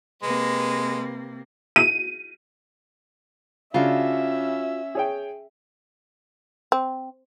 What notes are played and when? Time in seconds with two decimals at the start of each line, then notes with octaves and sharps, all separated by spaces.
0.22 C3 G#3 A#3 B4
1.76 D#7
3.74 C#3 C#4 D4 F4 F#4 E5 E6
4.95 G#4 C#5 G5
6.72 C4